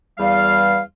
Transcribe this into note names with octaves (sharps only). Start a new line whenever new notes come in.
E2 G3 F5